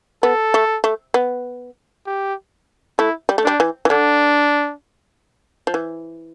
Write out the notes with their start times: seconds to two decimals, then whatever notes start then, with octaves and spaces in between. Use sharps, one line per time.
0.23 B3 A4
0.54 A3
0.84 A3
1.14 B3
2.07 G4
2.99 A3 E4
3.29 G3
3.38 A3
3.44 G3 D4
3.60 E3
3.85 E3
3.90 D3 D4
5.67 F3
5.74 E3